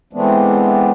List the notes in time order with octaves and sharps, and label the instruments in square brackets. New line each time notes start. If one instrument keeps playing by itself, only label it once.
[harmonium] E3 G#3 A3 B3 C4 D4